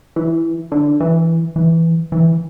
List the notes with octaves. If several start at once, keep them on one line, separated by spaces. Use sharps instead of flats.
E3
D3
E3
E3
E3